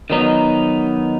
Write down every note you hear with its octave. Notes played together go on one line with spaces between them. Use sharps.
D#3 F#3 B3 D#4